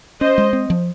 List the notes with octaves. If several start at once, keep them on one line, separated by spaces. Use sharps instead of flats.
C#4 C5 D#5
G#3
C4
F3